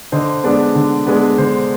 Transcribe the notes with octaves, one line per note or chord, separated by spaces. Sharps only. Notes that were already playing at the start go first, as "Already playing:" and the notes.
D3 C5 D#5
G#3 B3 D4
D3
G#3 B3 D4
D3 C5